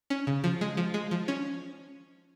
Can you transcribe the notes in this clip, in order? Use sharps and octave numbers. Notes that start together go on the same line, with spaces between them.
C#4
C#3
F3
G#3
F3
G#3
F3
C#4